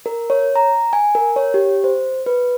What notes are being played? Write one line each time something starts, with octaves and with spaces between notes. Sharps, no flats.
A#4
C#5
A#5
G#5
A#4
C#5
G4
C5
B4